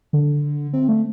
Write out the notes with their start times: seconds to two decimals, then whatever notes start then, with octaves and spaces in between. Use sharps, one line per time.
0.13 D3
0.73 C4
0.88 A3